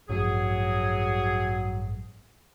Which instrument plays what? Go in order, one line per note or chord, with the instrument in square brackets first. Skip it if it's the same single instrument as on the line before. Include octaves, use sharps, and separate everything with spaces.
[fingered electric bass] A1 G2 F3 [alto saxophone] F#3 [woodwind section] G#4